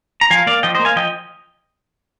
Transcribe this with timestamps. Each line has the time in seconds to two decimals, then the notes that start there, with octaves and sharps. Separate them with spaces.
0.21 A#5
0.31 F3 F5 G#5
0.47 A#3 D5 F5
0.63 F3 D#5 G5
0.75 C5 D#5
0.79 A#3
0.85 F5 G#5
0.96 F3 D#5 G5